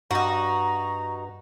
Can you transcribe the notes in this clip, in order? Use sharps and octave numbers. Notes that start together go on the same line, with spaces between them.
G2 D#4 F#4 A#5